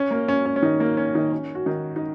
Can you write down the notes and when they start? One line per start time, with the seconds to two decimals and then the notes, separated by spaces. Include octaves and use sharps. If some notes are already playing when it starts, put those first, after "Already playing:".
Already playing: C#4
0.11 A#3
0.28 C#4
0.46 C#4
0.56 C#4
0.62 D#3 D#4
0.80 A#3
0.97 C#4
1.15 D#3 D#4
1.32 C#4
1.55 F#4
1.66 D#3 D#4
1.96 D#4